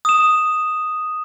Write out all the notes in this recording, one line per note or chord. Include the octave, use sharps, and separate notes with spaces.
D#6 E7